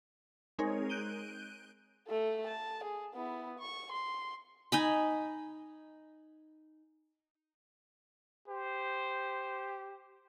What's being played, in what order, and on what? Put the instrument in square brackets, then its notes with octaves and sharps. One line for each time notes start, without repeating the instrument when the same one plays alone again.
[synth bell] G#3 C4 D#4 G#4 A#4 C#5
F#6 G6 D7 D#7 G7
[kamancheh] A3 A4
A5
G#4
B3 E4
C#6
C6
[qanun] D#4 G#5 B5
[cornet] G4 [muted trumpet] C5